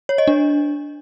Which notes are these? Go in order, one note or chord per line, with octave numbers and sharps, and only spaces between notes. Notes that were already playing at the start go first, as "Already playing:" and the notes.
C#5
D#5
D4